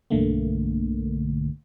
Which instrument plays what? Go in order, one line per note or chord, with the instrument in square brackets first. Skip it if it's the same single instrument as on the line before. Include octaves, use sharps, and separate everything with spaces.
[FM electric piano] B1 G2 D3 A3 A#3